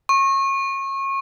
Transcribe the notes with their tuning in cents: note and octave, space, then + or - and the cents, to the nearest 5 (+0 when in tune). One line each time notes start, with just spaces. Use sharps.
C#6 -30